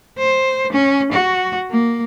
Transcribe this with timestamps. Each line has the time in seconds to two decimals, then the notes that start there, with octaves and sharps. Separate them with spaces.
0.18 C5
0.72 C#4
1.12 F#4
1.71 A#3